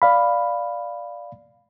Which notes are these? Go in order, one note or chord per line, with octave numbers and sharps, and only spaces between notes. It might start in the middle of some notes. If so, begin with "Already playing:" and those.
D5 F5 B5